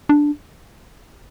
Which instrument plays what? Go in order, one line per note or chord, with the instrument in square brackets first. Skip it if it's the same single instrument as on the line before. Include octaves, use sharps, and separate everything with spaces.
[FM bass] D4